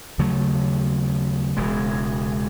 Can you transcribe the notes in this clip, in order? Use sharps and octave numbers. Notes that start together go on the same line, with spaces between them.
D#2 C#3 F#3 A3
E1 E2 C#3 G#3